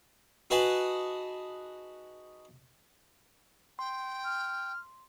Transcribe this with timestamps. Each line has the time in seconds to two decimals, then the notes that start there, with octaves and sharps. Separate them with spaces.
0.50 D#4 F#4 G#4 B4 G#5 A5
3.79 G5 C6
4.24 F6